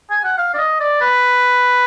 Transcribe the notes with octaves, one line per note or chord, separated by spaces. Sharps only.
G#5
F#5
F5
D5
D#5
D5
B4